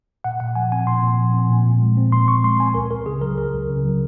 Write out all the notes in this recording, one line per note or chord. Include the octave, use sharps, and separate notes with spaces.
A#2 F#5
A#2 F#5
F3 G#5
C4 G#5
A#2 C6
A#2
F3
C4
A#2
A#2
G#3
C4
A#2 C6
A#2 C#6
G#3 C6
C4 G#5
C#2 A#4
C#2 A#4
C#3 G#4
F#3 A#4
C#2 A#4
C#2
C#3
F#3